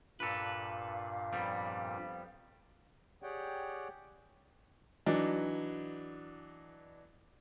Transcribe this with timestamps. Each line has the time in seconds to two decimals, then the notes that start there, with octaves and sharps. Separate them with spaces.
0.20 G2 A#2 A4 B4 F5
1.33 F2 G3 B3
3.23 G4 G#4 C#5 D5 F#5 G5
5.06 E3 F#3 D4 D#4